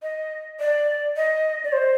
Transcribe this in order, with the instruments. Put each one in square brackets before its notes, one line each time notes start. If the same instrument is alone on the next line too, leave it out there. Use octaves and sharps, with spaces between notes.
[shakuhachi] D#5
D5
D#5
D5
C5